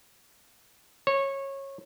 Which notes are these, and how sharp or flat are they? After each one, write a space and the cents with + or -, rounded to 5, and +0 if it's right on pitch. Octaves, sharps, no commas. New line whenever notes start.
C#5 -20